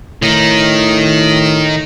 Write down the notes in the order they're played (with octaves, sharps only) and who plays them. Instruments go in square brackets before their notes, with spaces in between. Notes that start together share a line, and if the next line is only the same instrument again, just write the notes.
[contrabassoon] A2 [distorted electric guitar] D#3 D#4